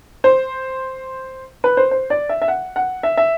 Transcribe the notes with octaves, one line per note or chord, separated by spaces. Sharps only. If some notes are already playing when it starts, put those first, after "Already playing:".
C5
B4
C5
C5
D5
E5
E5
F#5
F#5
E5
E5